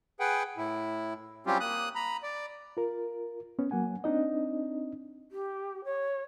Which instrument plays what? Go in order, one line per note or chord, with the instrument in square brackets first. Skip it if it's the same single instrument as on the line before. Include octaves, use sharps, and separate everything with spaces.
[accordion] G#4 B4 F#5 G5
A2 E4
F#3 G3 C4 C#4 F4 G4
A#3 D#6 F#6
A#5 B5
D5
[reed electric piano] F4 A#4
B3 C#4
F#3 A#3 F#5 G#5
C4 D4 D#4 D#5
[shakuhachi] G4
C#5